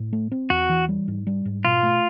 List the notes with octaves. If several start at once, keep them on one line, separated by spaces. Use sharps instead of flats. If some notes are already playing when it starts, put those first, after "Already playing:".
Already playing: A2
A3
C4
E2 F#4
E3
G3
G#2
G3
G#2
B2 F4
A3